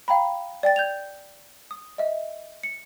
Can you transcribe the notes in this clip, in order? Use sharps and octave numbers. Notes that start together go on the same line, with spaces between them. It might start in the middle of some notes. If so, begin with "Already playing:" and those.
F5 G5 A#5 B5
D5 G5 A6
G6 G#6 F7
D#6
D#5 E5
C#7